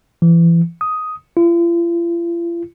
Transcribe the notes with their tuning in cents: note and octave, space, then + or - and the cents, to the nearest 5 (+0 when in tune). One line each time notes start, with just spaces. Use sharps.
E3 +30
D#6 +5
F4 -45